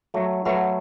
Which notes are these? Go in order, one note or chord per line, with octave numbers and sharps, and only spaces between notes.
F#3 A3
F#3 A3 B4 F#5 B5